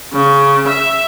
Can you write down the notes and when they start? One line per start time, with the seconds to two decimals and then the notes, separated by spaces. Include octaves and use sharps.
0.13 C#3
0.68 E5